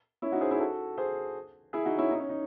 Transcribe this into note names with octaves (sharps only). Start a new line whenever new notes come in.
C#4 E4
D#4 F#4
G#4 C5
E4 G#4
F#4 A4
G#4 C5
E4 G#4
D#4 F#4
C#4 E4
D#4
C#4
D#4